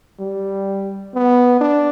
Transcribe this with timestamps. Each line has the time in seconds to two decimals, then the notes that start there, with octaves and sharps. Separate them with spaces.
0.20 G3
1.14 B3
1.61 D4